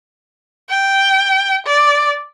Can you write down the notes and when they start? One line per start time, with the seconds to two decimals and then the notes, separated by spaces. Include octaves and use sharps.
0.70 G5
1.66 D5